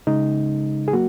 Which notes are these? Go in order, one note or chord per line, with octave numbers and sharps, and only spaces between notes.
C#3 G#3 D#4
G#4
F#3 A#3 F#4